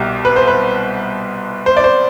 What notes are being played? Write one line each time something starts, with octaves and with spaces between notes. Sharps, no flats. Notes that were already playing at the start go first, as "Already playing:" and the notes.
Already playing: C2 B2 G4
B4
C5
B4
C5
D5
C5